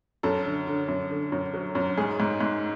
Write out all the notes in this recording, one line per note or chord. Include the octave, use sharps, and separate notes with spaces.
F#2 A4
D3
D3
F#2
D3
F#2
F#3
F#2
G#2 G#4
G#2
G#2